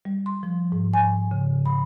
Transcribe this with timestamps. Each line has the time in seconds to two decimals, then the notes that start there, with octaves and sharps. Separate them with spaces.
0.05 G3
0.26 C6
0.43 F3
0.72 G#2
0.94 G#5
1.31 C#3
1.66 B5